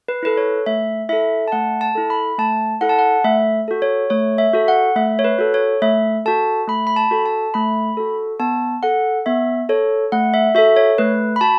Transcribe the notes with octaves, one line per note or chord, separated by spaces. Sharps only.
B4
E4 A4 B4
C#5
A3 E5
E4 A4 E5
A5
A3 F#5
A5
E4 A4
B5
A3 A5
E4 A4 F#5
A5
F#5
A3 E5
F#4 A4
C#5
A3 C#5
E5
F#4 A4
F#5
A3 E5
C#5
B4
F#4 A4
C#5
A3 E5
F#4 A4 A5
A3 B5
B5
A5
F#4 A4
A5
A3 B5
F#4 A4
B3 A5
A4 F#5
B3 E5
A4 C#5
A3 F#5
E5
F#4 A4 E5
C#5
A3 B4
B5
F#4 A5